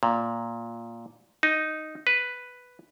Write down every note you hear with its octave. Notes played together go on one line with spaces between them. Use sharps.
A#2
D#4
B4